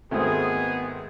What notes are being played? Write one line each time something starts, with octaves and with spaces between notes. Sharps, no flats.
G#1 D#3 G#3 A3 B3 C4 D#4 G#4